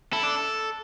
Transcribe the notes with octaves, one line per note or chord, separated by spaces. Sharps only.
E4 A4
D4